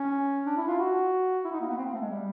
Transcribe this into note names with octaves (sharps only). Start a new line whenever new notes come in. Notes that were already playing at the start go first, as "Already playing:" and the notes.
Already playing: C#4
D4
E4
F4
F#4
E4
D#4
A#3
B3
C4
A#3
A3
G#3
G3